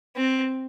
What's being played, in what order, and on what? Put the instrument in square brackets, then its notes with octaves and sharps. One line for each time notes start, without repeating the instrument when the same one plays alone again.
[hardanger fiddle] C4